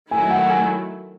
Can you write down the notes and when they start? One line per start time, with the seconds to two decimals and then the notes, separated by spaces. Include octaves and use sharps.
0.11 D#3 F#3 A3 E4 G#5
0.31 F#5
0.50 G#5